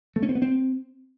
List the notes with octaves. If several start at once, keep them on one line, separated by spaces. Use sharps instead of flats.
A3
C#4
C4
B3
C4